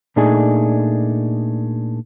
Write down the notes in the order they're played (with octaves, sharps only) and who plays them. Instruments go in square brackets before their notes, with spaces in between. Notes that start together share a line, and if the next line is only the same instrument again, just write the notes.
[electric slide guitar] A#2 A3 D4 D#4 G#4 G#5